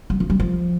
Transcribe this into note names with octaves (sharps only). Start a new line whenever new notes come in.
G3
F3
G3
F3